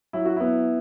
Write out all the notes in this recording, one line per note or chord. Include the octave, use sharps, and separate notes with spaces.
F#3 E4
F#4
B3 E4